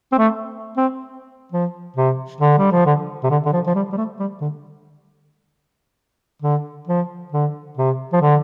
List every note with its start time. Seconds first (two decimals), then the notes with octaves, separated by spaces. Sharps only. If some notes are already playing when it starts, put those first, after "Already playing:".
0.12 C4
0.18 A3
0.77 C4
1.52 F3
1.96 C3
2.41 D3
2.58 G3
2.72 F3
2.86 D3
3.23 C3
3.30 D3
3.46 D3
3.53 F3
3.67 F3
3.75 G3
3.92 G3
3.97 A3
4.19 G3
4.41 D3
6.42 D3
6.87 F3
7.32 D3
7.77 C3
8.13 F3
8.21 D3